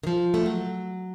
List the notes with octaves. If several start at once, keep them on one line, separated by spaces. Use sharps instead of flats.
D#3
F3
A3
F#3